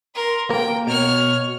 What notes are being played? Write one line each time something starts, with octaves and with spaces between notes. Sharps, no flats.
A#4 C6
A#3 A#4 G5
B2 C#5 F6